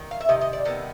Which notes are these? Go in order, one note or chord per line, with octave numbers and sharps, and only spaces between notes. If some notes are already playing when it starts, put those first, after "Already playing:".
Already playing: D#3
F5
E5
C3 D#3 D#5
D#5
D5
C3 D#3 B3 A4